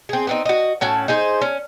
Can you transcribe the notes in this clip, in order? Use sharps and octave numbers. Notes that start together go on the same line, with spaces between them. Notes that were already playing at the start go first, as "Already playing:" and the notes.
C4 G#4
B3 C4 D#4
F#4 D#5
A2 C#4 F#4 A5
D#4 G#4 C5
C#4